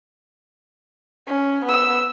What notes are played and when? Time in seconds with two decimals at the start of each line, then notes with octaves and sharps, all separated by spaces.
1.28 C#4
1.65 B3 E6